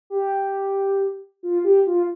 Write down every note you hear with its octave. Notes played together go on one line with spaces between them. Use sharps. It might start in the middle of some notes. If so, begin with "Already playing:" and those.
G4
F4
G4
F4